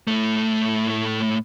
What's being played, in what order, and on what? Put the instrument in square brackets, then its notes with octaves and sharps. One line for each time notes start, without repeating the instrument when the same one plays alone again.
[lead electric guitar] A2 A3